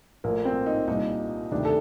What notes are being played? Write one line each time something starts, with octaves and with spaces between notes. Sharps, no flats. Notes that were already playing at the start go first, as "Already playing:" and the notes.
A#1 A2 A#3
C4
D#4
C2 A#2 D#4
D2 C3 D#3 D4
A4